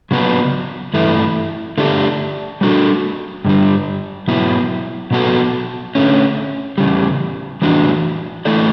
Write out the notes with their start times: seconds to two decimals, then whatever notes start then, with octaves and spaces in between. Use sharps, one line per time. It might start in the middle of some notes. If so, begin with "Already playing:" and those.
0.11 C#3 F#3 B3 F#4 B4
0.94 G2 E3 A3 E4
1.78 D3 A3 D4 G4
2.61 G3 D4 F#4 A4
3.45 G2 D3 G3
4.28 B2 F#3 B3 E4
5.11 B2 F#3 B3 F#4 A4
5.95 D3 A3 C#4
6.78 E2 C#3 G3
7.62 A2 E3 G3 D4 F#4
8.45 E3 A3 E4 A4 D5